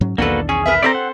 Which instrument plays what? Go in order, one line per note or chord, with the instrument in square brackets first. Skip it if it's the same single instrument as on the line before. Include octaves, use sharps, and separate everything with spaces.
[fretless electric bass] G#2 F#3 C#4
[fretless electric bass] B1 E2 D#3 [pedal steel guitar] A#3 F#4 B4 [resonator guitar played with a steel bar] D4 A4
[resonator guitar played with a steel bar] C#4 [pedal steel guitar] G#4
[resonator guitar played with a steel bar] A#4 B4 E5
[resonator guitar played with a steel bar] C4 A4 C5 [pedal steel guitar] D5 E5 A#5
[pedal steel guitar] F#5